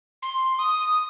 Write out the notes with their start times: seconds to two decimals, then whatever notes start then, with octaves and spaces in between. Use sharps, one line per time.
0.22 C6
0.59 D#6